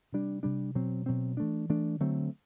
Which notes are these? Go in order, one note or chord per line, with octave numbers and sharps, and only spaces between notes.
C3 G3 D4
C3 G3 D4
B2 F#3 C4
B2 F#3 C4
E3 A3 D4
E3 A3 D4
D3 F#3 A3 C4